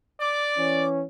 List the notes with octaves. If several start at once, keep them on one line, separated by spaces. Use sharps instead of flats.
D5 D6
E3 C#4